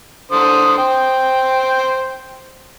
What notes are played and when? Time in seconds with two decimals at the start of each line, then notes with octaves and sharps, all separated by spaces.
0.32 D3 C5 D#6
0.78 C5 G5